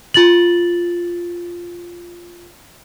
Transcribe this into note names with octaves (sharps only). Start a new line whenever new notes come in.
F4 A6 F#7